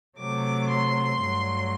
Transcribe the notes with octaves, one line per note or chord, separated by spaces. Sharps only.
C3 F#3 A3 D6
C6
G2 F#3 A3